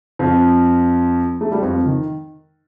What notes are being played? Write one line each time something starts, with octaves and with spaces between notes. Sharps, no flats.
F2 F3
A3
G3
F2 F3
D#3